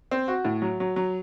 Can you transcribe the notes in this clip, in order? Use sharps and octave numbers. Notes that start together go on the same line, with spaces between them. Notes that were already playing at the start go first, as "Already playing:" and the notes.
C4
F#4
A2
F#3
F#3
F#3